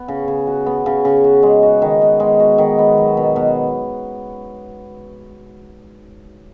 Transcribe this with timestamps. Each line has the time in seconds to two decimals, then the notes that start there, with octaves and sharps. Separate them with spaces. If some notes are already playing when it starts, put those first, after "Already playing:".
Already playing: B3
0.08 C#3
0.28 C#3
0.47 F#4
0.66 B3
0.86 C#3
1.05 C#3
1.24 F#4
1.43 G#3
1.63 F#4
1.82 D#3
2.01 B3
2.20 G#3
2.40 F#4
2.58 D#3
2.78 B3
2.98 F#3
3.17 B2
3.36 B2